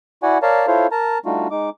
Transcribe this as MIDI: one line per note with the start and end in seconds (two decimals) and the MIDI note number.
0.23 0.38 64
0.23 0.38 66
0.23 0.38 74
0.23 0.38 78
0.23 0.38 80
0.42 0.66 70
0.42 0.66 73
0.42 0.66 74
0.42 0.66 77
0.42 0.66 81
0.42 0.66 82
0.67 0.87 64
0.67 0.87 65
0.67 0.87 69
0.67 0.87 72
0.67 0.87 73
0.67 0.87 77
0.91 1.18 70
0.91 1.18 81
0.91 1.18 82
1.25 1.48 55
1.25 1.48 57
1.25 1.48 62
1.25 1.48 63
1.25 1.48 65
1.25 1.48 66
1.51 1.70 56
1.51 1.70 63
1.51 1.70 86